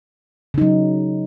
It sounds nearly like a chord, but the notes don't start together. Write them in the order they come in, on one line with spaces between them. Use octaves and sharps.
C#3 D#4 F#3